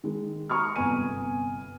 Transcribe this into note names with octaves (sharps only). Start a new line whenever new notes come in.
D#3 G#3
A#5 C#6 D#6 F6
G1 C3 B3 B4 G#5 D#7